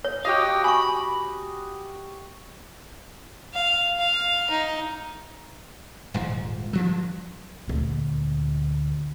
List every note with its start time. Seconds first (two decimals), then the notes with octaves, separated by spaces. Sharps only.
0.04 C#5
0.25 F#4 G4 D#5 F5 G5
0.64 G#5 B5 C#6
3.54 F5
3.99 F5
4.50 D#4
6.14 D#1 G#2 F3
6.73 G2 F3 F#3
7.67 D2 A#2